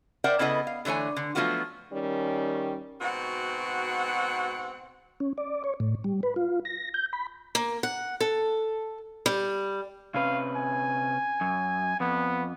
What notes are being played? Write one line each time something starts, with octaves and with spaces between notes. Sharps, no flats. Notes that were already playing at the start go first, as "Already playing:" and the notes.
A#4 C5 D5 E5 F#5 G5
C#3 B3 E4 A4 D#5
F5
D3 E3 A3 C#5 G#5
D3
F3 F#3 A3 B3 F4 F#4
D#3 G3 C#4
G#2 B2 C4 F#4 F#5
C#4
D5
C#5
A2
G3
B4
F4
A#6
G6
B5
A#3
F#5
A4
G3
C3 C#4 B4 F5
G#5
F#2
F2 B3